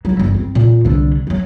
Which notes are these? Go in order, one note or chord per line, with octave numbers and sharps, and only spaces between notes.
F#3 E4
G1
C4
A#2
C2 D3
F#3 A3